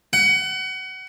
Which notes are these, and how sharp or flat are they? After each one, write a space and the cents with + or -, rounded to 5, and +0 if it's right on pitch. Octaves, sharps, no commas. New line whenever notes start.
F#5 +30